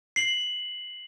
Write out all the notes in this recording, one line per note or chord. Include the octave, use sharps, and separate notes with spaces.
C7 F#7